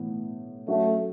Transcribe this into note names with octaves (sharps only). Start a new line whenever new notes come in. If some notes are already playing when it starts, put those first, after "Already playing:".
Already playing: A2 E3 B3
F#3 A3 C#4 F#4